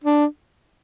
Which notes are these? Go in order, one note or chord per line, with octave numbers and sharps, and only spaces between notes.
D4